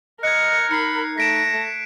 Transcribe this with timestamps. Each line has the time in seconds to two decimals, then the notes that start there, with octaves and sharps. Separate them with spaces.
0.23 A#4 D#5 F#6 G#6 C#7
0.71 D#4 B5 C7 C#7
1.18 A3 A#6 B6 D7 E7